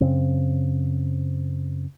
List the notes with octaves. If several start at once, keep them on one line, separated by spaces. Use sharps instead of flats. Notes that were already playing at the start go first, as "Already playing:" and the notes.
F#2 C#3 C4